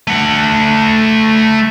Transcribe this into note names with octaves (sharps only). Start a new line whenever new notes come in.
A3 F#5